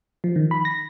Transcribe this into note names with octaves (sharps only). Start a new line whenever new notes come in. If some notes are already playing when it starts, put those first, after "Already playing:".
F3
D#3
B5
A#6